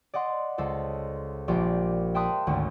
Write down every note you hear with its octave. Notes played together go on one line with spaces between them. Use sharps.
D5 D#5 F#5 C6
C#2 A4 C5
A#1 G4 C5 D5
E5 G5 A5 C6 D#6 F#6
G#1 D2 C#4